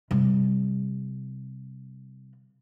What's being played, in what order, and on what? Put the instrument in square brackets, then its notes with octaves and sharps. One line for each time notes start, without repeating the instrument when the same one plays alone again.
[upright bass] C3 G3